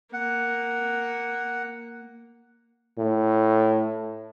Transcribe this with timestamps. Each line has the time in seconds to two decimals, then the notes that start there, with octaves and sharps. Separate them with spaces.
0.13 A#3 F#5
2.98 A2